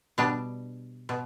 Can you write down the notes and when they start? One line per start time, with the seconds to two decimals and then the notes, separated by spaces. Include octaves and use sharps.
0.18 B2 G3 D4
1.09 B2